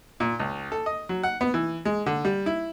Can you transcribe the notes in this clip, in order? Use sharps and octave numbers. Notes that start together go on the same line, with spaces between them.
A#2
C#2
A4
D#5
F#3
F#5
B3
E3
G#3
D3
G3
E4